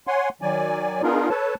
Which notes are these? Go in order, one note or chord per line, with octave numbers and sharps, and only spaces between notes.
C#5 F#5 G#5 C6
D#3 F#3 D5 G#5
B3 D4 D#4 F4 G#4 A#4
A4 B4 C#5 A5